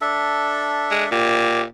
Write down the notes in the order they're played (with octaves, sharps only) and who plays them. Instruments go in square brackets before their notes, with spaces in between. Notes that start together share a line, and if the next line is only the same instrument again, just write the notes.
[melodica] D4 A4 E5
[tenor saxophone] G#3
[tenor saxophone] A#2 [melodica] G4